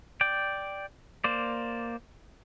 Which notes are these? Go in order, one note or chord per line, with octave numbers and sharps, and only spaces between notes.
D5 G5
A#3 C5 D5